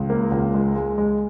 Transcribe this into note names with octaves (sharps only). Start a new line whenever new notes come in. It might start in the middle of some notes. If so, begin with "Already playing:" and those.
Already playing: C#2
A#3
C#2
G#3
G#3
G#3